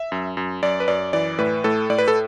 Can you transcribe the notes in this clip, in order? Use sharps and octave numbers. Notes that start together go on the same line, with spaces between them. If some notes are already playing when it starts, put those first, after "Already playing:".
Already playing: E5
F#2
F#2
F#2 D5
B4
F#2 D5
E3 D5
A2 B4
A2 A4
A2 D5
B4
A4